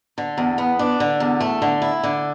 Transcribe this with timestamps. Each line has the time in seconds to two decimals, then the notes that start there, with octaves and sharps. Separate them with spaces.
0.18 D3
0.38 E2
0.58 B3
0.79 D4
1.00 D3
1.20 E2
1.40 A3
1.62 D3
1.82 E4
2.04 D3